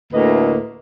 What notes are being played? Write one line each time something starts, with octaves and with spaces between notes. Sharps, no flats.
D2 A2 A#3 B4 D#5